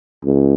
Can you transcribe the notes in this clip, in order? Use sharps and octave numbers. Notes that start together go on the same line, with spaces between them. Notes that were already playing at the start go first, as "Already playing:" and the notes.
C#2